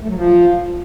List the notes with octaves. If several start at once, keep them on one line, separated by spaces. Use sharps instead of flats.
A3
F#3
F3